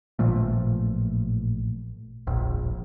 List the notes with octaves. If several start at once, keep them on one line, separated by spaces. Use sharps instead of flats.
A1 A#2 F3 A3
E1 A#1